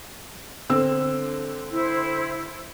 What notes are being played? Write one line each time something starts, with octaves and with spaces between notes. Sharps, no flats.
D3 C4 E6
E4 C5